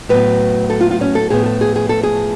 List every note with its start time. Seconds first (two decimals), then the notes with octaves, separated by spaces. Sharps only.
0.09 A2 F#3 B3 B4
0.70 A4
0.81 F4
0.91 F4
1.01 C#4
1.15 A4
1.30 A2 F3 B3 G#4
1.46 A4
1.61 G#4
1.76 G#4
1.89 A4
2.03 G#4